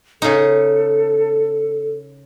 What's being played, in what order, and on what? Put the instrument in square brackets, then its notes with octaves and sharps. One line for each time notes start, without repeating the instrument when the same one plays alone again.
[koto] C#3 D#4 [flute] A4